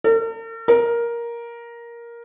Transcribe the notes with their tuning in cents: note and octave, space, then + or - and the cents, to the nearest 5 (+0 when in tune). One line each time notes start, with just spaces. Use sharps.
A#4 -45
A#4 +10